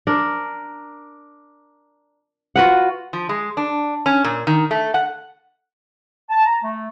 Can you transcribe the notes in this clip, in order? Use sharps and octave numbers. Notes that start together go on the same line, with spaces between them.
D4 A#4
F4 F#4 B4 F#5
F3
G#3
D4
C#4
A#2
D#3
A3
F#5
A5
A#5
A3